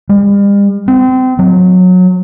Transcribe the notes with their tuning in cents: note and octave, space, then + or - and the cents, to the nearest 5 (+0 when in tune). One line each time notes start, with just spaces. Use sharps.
G3 +45
C4 -30
F#3 -20